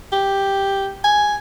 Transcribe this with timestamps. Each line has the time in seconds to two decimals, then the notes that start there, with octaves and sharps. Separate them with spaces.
0.12 G4
1.04 G#5